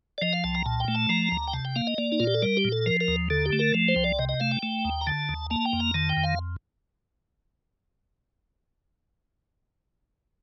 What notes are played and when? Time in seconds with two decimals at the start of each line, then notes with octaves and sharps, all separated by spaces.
0.18 D5
0.22 F3 D#5
0.33 F5
0.44 C2 A5
0.55 A#5
0.66 A#2 A5
0.80 G5
0.88 A3
0.95 A5
1.09 F3 A#5
1.32 D2
1.48 G5
1.53 C3 A5
1.65 G5
1.76 A#3 F5
1.87 D#5
1.98 A#3 D5
2.12 D#4
2.20 A#2 F4
2.27 G4
2.34 A4
2.42 G3 A#4
2.57 G4
2.65 A#2
2.72 A4
2.86 F3 A#4
3.01 A#4
3.08 D#2
3.30 D3 A4
3.46 G4
3.53 A3
3.59 A#4
3.74 F3
3.88 C5
3.96 C2
4.04 D5
4.19 C3 D#5
4.29 D#5
4.40 A3 F5
4.51 G5
4.63 A3
4.85 D#2
5.01 A#5
5.06 D3 A5
5.29 D#2
5.50 A#3 A5
5.65 G5
5.73 F2
5.80 A#5
5.94 D#3 A5
6.09 G5
6.17 F2
6.24 F5